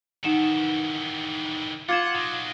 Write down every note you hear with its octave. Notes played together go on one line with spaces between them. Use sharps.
D#3 E3 D#4 F#5 E7
F4 F#5 D6 G#6 E7
D#4 F#4